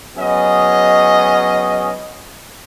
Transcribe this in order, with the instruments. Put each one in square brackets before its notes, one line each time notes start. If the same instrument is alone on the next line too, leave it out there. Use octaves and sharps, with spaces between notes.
[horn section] F#3 B3 C#4 G#4 D#5